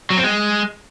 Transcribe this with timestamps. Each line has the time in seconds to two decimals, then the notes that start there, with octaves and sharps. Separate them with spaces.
0.10 F#3
0.17 C4
0.24 G#3